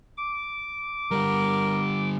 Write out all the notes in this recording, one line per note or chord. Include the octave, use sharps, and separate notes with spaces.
D6
D3 G3 A#4